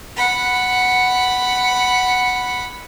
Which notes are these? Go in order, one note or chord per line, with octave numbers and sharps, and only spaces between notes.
F#5 B5